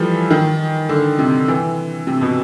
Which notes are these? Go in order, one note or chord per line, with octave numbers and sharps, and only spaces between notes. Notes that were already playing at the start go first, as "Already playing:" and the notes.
Already playing: E3 F3 G3 A3
D#3
D3
C3
E3
C3
B2